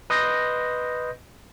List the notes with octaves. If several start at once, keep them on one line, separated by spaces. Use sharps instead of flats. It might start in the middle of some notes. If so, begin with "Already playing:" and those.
B4 D#5 C6 G6 A#6